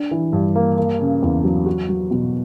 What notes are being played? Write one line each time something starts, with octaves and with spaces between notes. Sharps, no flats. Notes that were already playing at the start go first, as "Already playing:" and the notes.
Already playing: D4
E3
G2
A#3
A#3
C#3
E2
F#3
F#4
F#3
B2